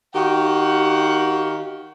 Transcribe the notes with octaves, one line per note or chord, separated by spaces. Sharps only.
D#3 F#4 G4 F5 F#5